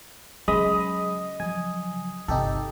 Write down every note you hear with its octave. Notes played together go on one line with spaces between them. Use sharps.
C#3 F#3 G#3 D#5 B5 D#6
F3 F#3 G#5
G1 C3 D#4 G4 A4